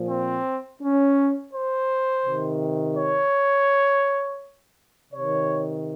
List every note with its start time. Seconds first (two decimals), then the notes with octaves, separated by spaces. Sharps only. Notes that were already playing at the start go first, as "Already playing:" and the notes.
Already playing: A#2 F3
0.08 C4
0.80 C#4
1.53 C5
2.25 C3 D#3
2.96 C#5
5.12 C3 D#3 C#5